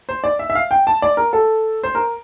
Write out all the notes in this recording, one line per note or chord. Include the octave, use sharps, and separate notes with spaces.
C5
D5
E5
E5
F5
G5
A5
D5
A#4
A4
C5
A#4